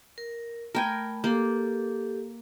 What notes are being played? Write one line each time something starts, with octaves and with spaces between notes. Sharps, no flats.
A#4
A3 A#4 G5 G#5 B5
A#3 G4 A4